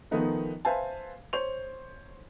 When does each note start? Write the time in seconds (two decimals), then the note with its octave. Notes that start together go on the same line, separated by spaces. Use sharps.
0.11 D#3 F3 A3 B3 D#4 B4
0.65 B4 C5 E5 F5 G#5 A5
1.33 C5 C#5 C#6 F7